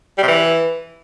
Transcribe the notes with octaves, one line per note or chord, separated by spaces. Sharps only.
G3
C3
E3